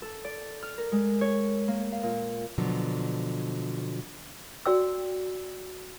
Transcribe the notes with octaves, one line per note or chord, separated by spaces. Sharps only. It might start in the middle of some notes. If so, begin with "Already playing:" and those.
A4
D5
F6
A#4
G#3
C#5
A#3
F5
A#2
B2 D3 F3 F#3
F#4 D5 G5 E6